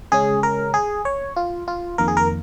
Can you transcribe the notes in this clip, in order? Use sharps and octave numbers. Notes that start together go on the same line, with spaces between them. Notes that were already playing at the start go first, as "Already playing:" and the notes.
C#3 G#3 C#4 G#4
A#4
G#4
C#5
F4
F4
F2 D#3 A#3 A#4
G#4
A#4